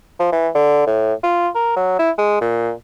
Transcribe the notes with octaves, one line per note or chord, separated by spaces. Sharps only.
F3
E3
D3
A2
F4
A#4
F#3
E4
G#3
A#2